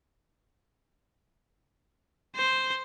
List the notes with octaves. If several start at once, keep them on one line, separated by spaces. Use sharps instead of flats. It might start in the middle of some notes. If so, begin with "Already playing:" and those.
C5